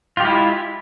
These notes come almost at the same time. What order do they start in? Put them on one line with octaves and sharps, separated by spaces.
F4 G4 G#3 E4